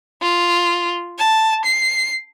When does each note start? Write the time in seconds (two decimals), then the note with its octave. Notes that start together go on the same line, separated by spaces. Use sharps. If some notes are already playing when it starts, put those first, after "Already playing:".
0.22 F4
1.19 A5
1.65 C7